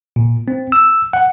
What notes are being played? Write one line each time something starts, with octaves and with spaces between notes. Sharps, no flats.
A#2
C4
E6
F#5